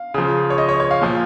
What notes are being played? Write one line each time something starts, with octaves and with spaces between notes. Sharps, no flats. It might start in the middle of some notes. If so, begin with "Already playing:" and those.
Already playing: F5
C#3 F3
C#5
D#5
C#5
C#5
F5
A#2 F3